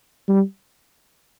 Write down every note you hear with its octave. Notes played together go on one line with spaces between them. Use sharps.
G3